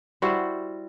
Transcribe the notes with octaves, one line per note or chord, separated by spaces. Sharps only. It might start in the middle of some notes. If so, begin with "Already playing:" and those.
G3 E4 F#4 C5